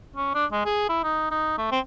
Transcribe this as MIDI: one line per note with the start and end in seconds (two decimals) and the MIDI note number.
0.16 0.30 61
0.34 0.45 62
0.52 0.62 56
0.66 0.87 68
0.89 1.00 64
1.03 1.29 63
1.31 1.53 63
1.58 1.69 57
1.71 1.79 60